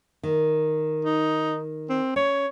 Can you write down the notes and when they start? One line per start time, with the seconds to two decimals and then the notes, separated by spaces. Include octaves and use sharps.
0.23 D#3
1.05 D#4
1.90 C4
2.16 C#4 C#5